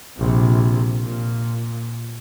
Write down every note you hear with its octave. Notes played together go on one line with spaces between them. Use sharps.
A#1 C3
A#2